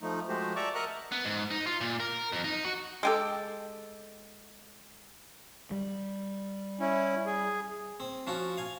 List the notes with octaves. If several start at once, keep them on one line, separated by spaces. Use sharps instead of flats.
F3 A3 D#4
F3 G#3 A3 F#4 G4 C5
D5 E5 A5 A#5 C#6 D6
A#4 D#5 E5 F#5 A#5 F#6
B3
G#2
D#4
F4
A#2
A#4
F2
D#4
F#4
G#3 G4 A4
G3
C#4 E4
G#4
C4
F3 C#4 F4 F#4
F5 G#5